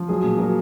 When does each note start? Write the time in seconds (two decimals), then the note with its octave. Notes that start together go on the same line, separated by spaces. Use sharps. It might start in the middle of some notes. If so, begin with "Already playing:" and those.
Already playing: F3
0.08 F#3 G#4
0.24 A#2
0.38 F#3 A#4